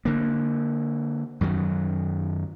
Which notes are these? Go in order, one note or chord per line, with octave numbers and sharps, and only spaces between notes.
D3 A#3
F#2 D#3 F#3